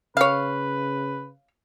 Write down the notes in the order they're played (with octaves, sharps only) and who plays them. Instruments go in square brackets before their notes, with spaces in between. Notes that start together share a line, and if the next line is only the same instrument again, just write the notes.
[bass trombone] C#3 [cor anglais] B4 [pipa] C#5 F5